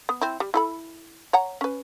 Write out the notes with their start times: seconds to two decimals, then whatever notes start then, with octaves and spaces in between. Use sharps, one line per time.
0.09 B3
0.21 C4 E4
0.40 G3
0.54 E4 A4 B5
1.33 C#5 F#5 A#5
1.61 C#4 B4